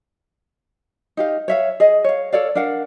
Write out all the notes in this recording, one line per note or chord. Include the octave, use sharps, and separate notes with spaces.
D#4 G4 F5
C#5 E5 F5
G#4 D#5
C#5 F5
A4 C#5 D5 F5
D4 A#4 F5 F#5